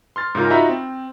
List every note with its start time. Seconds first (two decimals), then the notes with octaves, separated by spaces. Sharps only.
0.16 C6 F6 A6
0.35 G#2 C#3 F4 A#4
0.50 D#4 F4 F#4 E5 A#5 B5
0.69 C4